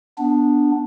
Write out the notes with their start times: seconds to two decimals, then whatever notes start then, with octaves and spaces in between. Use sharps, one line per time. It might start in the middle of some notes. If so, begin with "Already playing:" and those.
0.18 B3 D4